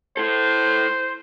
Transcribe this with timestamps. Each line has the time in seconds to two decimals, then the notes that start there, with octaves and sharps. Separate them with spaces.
0.17 E4 A4 C5